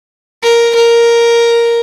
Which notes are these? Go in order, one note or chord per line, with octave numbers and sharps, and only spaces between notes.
A#4
A#4